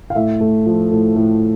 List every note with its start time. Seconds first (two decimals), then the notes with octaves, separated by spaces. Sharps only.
0.10 F5
0.15 A2 E5
0.40 A3
0.66 F3
0.92 A2
1.16 A2